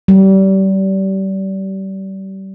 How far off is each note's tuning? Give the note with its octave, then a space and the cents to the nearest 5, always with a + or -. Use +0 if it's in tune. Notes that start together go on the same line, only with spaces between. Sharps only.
G3 -30